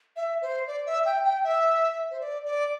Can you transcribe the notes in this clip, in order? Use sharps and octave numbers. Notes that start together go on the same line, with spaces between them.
E5
C5
D5
E5
G5
G5
E5
C5
D5
D5